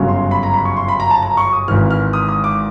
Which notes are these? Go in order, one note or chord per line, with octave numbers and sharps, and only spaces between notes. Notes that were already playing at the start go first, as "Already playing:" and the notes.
Already playing: G1 F#2 C#3 F#3
C6
B5
A#5
B5
C#6
C6
B5
A#5
A5
A#5
C#6
D#6
G#1 G#2 E3 F6
F6
D#6
D#6
D6